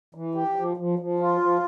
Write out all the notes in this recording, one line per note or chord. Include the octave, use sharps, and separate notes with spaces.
E3
G4
F3
F3
F3
F4
F3